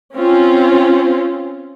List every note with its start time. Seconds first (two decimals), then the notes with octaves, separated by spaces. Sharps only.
0.15 C4 C#4 F4